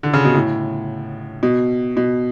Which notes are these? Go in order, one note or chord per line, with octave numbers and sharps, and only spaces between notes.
D3
C#3
B2
A2
B2
B2